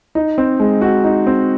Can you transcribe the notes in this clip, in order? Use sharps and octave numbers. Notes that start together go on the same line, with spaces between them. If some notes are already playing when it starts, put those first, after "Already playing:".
D#4
C4
G#3
F#4
D#4
C4